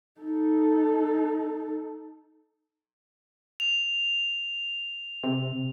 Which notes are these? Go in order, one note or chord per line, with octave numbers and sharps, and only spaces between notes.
D#4 A4
F7
C3